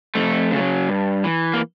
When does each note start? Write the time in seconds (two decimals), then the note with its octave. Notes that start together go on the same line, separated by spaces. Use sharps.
0.15 F2 A3
0.52 C#3 F#3
0.89 G2
1.24 E3
1.54 A#3